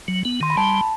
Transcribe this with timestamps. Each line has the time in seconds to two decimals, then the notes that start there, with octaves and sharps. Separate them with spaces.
0.08 F#3
0.25 B3
0.41 D#3 C6
0.50 B5
0.57 G3 A5